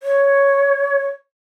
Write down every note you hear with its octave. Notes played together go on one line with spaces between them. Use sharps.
C#5